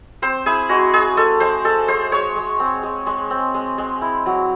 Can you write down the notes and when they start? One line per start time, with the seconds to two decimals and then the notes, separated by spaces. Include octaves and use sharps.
0.22 C4 C5
0.46 E4 G#4
0.69 G#3 F#4
0.93 G#3 G#4
1.17 G#3 A4
1.40 G#3 C5
1.65 G#3 A4
1.88 G#3 C5
2.12 G#3 C#5
2.36 G#3
2.60 C4
2.83 G#3
3.06 G#3
3.30 C4
3.54 G#3
3.78 G#3
4.01 E4
4.26 F#3